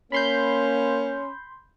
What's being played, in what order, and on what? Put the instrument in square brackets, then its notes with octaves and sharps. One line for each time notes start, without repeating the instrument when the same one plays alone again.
[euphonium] A#3 [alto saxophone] C#4 [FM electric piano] B5 C6 G6